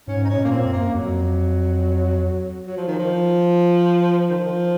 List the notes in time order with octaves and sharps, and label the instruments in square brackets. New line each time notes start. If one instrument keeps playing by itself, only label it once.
[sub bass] G#2 [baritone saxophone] C#4
[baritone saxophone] D#4
C#4
[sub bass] A#2
[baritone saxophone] A#3
C4
[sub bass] F#2
[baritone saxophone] A#3
[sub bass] F2 [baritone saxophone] F#3
[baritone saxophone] F#3
F3
D#3
F3
D#3
F3